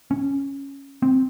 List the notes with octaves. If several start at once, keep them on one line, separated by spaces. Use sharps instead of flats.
C#4
C4